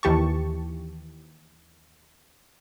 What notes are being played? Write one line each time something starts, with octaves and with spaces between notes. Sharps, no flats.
D#2 E3 G4 A5 C#6